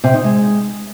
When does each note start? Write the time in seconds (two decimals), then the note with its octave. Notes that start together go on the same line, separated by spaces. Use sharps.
0.04 C3
0.14 D#4
0.24 G#3